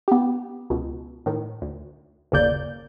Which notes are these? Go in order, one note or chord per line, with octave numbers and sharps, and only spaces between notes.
B3 G4
C#2 B2
A2 D#3
D2
G1 D#2 C#3 A#3 D5 G6